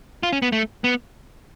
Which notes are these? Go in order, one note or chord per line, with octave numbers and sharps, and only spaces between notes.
F4
C#4
B3
A3
B3